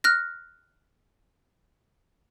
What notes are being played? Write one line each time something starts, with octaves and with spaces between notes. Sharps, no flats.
F6 F#6 A#6